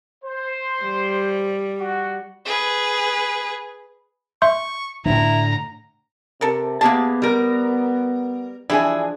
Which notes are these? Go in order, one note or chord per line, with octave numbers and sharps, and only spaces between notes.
C5
G3
F#4
G#4 B4
E5 C6 C#6 G6
A2 D3 E4 A#5
C3 A4 A#4
C3 A#3 B3 G4 G#4 A5
G3 A#4
E3 F3 G3 D4 E4 G#4 G#5